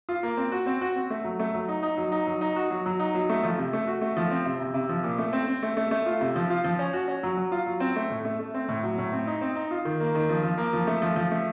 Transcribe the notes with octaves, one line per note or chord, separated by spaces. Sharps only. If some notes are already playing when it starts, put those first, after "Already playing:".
F4
A#3
C4
F#4
C4
F#4
C4
A3
F#3
A3
F#3
D#4
D#4
F#3
D#4
F#3
D#4
F#4
F#3
F#3
D#4
F#3
A3
F3
C3
A3
F#4
A3
F3
C4
C3
C3
C3
F3
A#2
A3
C4
C4
A3
A3
A3
F4
C3
F3
F4
F3
C#4
F#4
C#4
F#3
F#3
F4
F#3
C4
A3
A2
A3
A3
C4
A2
F#3
A2
C4
D#4
C4
D#4
F4
D#3
A#3
D#3
F3
F3
A#3
F3
A3
F3
F3
A3